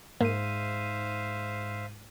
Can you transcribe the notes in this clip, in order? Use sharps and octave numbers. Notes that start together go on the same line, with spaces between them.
G#2 A#3 C5 E5 F5 D#7